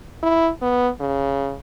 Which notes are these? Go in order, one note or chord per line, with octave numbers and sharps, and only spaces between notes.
E4
B3
C#3